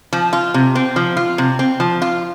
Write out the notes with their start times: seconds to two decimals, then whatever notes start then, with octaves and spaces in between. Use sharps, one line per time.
0.13 F3
0.33 F4
0.54 C3
0.75 C4
0.96 F3
1.17 F4
1.38 C3
1.59 C4
1.80 F3
2.02 F4